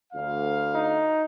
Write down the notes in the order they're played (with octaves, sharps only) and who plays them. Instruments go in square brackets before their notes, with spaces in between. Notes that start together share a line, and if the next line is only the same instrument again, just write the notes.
[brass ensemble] D2 F5
[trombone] D#4